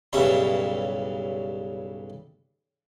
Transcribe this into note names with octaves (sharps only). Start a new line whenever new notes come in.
B1 G2 C#3 G3 E4 C#5